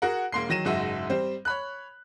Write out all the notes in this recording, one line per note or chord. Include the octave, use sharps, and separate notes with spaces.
F#4 G#4 A#4 F#5
E1 A#3 C6 C7
D#3 F#3 A#6 D#7 E7
F#1 G#2 F#4 E5
G3 C4 C5
C#5 B5 F#6